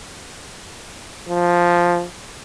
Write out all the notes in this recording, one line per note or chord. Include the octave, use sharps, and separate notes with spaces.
F3